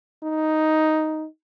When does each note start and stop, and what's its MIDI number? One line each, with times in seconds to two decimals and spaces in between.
0.23 1.27 63